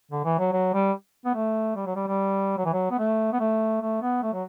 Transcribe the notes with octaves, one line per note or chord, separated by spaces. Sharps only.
D3
E3
F#3
F#3
G3
B3
A3
G3
F#3
G3
G3
F#3
E3
F#3
B3
A3
B3
A3
A3
B3
A3
F#3